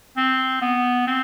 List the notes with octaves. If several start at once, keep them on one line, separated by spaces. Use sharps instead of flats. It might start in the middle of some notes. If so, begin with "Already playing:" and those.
C4
B3
C4